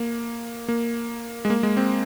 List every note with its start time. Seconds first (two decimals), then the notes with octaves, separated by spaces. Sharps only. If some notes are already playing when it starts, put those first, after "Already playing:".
Already playing: A#3
0.68 A#3
1.45 G#3
1.50 A#3
1.63 G#3
1.77 C4